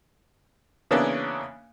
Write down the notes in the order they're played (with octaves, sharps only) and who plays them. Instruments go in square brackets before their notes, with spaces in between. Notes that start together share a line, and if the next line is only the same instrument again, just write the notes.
[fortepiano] C#3 E3 A#3 B3 C#4 D4